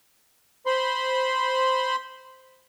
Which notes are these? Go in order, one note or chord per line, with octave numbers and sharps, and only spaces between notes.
C5 B5 C6